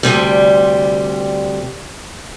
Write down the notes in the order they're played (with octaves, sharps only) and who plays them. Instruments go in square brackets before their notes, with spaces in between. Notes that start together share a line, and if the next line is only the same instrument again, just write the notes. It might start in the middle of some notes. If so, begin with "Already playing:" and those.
[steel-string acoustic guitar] D2 C3 G3